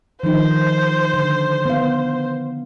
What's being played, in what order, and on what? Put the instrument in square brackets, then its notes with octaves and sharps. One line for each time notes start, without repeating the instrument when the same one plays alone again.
[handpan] D#3 F3 D#4 [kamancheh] C5
[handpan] D3
B3 F5